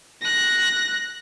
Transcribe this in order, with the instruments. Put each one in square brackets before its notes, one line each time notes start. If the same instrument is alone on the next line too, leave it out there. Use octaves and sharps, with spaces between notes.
[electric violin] F#6 A#6